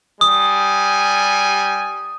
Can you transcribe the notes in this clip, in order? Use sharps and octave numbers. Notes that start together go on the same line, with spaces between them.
G3 G#5 D#6